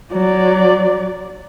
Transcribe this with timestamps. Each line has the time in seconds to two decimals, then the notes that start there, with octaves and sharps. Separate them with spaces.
0.12 F#3 D5